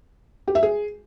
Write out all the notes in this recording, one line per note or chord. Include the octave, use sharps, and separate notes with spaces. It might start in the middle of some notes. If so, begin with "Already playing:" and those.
G4
E5
G#4